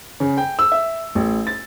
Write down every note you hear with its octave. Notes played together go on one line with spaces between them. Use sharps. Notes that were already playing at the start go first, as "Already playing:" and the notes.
C#3
G5
E6
E5
A1
A6